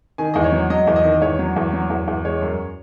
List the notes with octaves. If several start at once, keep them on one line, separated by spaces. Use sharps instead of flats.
D#3 G#5
E2 D#5
C#5
F#3
F#3 D#5
E2
D#5
D#3
E2 C#5
F#3
E2
F#3
E2
E2
G#3 C#5
F#2